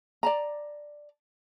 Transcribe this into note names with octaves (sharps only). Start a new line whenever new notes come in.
D5 A5 A#5